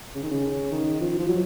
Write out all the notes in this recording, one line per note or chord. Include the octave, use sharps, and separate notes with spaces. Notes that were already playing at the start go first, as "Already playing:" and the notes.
C#3
D#3
C#3
D#3
F3
F3
F#3